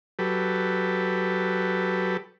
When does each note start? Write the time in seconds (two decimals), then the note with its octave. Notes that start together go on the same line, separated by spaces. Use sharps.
0.19 F#3 G4 A4 B4